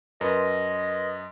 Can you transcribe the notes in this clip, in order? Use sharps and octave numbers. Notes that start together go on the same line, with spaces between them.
F#2 A#4 B4 D#5 C6